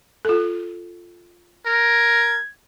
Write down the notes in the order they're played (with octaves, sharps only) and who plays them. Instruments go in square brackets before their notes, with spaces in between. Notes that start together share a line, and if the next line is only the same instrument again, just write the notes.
[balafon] F4 A4
[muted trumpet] A#4 [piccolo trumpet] G#6